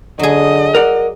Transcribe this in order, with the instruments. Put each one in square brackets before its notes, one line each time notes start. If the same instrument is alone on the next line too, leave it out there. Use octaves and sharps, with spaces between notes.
[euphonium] D3 [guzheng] F#3 G#4 [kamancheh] D#5
[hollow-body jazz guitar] A#4 D5 F#5